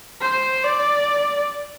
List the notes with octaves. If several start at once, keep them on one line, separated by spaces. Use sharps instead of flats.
C5
D5